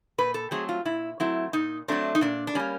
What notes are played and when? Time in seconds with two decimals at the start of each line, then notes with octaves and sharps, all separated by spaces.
0.18 A#2 B4
0.34 A4
0.51 F#3 A3 C4 G#4
0.69 F4
0.85 A#2 E4
1.20 F#3 A3 C4 E4
1.53 A#2 D#4
1.88 F#3 A3 C4 D4
2.15 D#4
2.21 A#2 D4
2.47 D4
2.55 G3 A#3 C#4